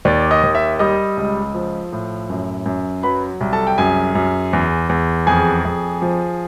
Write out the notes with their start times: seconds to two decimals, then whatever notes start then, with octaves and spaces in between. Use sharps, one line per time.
0.05 D#2 D5 D6
0.31 D#5 D#6
0.43 D#2
0.55 E5 E6
0.79 G3 D#5 D#6
1.17 C#2
1.54 F3
1.92 A2
2.30 F#2
2.66 F#2
3.03 F#3 B4 B5
3.41 C2
3.53 A4 A5
3.67 G5
3.78 F#2 G#4 G#5
4.15 F#2
4.53 E2
4.89 E2
5.27 F2 G#4 G#5
5.65 F2
6.02 F3